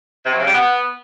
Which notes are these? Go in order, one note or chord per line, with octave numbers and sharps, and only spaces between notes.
C3
F#3
C#3
G3
B3